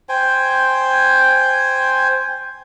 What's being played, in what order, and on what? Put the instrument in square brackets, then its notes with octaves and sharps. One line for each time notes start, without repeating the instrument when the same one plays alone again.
[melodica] C5 G5 G#5